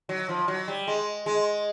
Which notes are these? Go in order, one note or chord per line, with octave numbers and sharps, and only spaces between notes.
F#3
F3
F#3
G3
G#3
G#3